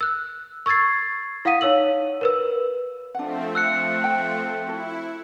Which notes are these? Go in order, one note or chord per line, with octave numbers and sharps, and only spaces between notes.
E6 F#6
C#6 E6 G#6 A6 C7
E4 F5 F#5 D#6 B6 D#7
D#4 C#5 F5 E6 F#7
A#4 B4 E6
F3 A3 C4 D4 F#5
E6 F#6 C#7
G5
E4 F#4 A4